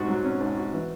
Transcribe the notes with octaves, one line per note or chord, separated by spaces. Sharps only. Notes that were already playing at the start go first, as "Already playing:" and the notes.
Already playing: G#2 F#4
F#3
C#4
G#2
F#4
E3